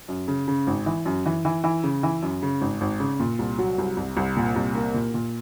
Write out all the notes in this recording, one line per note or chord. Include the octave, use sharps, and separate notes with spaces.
F#2
C#3
C#3
G#1
E3
F#2
E3
E3
E3
C#3
E3
F#2
C#3
G#1
G#1
C#3
A#2
C2
F#3
C2
C2
C2
A#2
C2
A#3
A#2
A#2